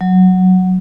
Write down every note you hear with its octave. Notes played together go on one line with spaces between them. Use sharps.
F#3